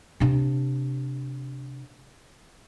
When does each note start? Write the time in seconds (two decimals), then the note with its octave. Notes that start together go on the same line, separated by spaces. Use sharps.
0.20 C3 D4